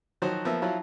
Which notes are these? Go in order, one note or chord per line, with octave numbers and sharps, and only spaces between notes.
D#3 F3 F#3 F#4 C5
F3 A#3 B3 E5
F3 F#3 E4 F4